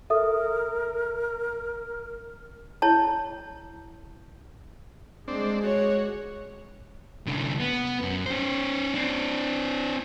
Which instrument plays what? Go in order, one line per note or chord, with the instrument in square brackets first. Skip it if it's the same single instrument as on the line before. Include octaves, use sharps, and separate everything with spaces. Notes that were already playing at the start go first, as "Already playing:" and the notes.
[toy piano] A4 [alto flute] A#4 [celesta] E5 D#6
[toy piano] E4 C#5 A5
[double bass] G#3 [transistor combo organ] C4 D4
[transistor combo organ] F#4 [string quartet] C#5
[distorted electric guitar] C2 D3
B3
F#2
C#4 C5
C4 D4